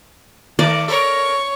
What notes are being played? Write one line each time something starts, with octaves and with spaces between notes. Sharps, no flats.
D#3 A3 A#4 D5
A4 A#4 C#5